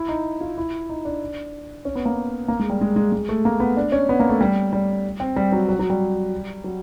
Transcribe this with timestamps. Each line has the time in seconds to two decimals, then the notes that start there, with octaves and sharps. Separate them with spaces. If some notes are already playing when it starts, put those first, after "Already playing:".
Already playing: E4
0.08 D#4
0.41 F4
0.57 E4
0.89 D#4
1.05 D4
1.85 C#4
1.95 B3
2.06 A#3
2.48 A#3
2.59 G#3
2.70 G3
2.81 G#3
2.96 G#3
3.12 G#3
3.29 A3
3.45 A#3
3.60 B3
3.77 D4
3.92 C#4
4.09 B3
4.20 A#3
4.29 A3
4.41 G3
4.73 G3
5.20 C4
5.36 G3
5.52 F#3
5.69 F#3
5.79 F#3
5.90 G3
6.64 F#3